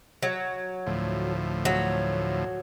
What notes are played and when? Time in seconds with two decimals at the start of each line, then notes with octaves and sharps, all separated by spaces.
0.23 F#3
0.87 D2 A2 F3
1.65 F#3